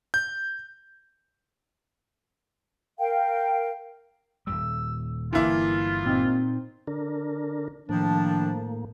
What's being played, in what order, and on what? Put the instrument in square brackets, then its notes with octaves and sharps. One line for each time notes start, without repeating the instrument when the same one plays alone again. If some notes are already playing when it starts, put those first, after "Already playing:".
[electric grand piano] G6
[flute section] A#4 F5 G5
[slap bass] D#1 C2 G3 [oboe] E6
[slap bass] G1 D3 [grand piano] E3 A#3 E4 [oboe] F4
[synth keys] A#2 C4 D#4
[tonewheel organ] D3 D4 A#4
[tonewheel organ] A2 A#3 [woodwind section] D#3 F3 D4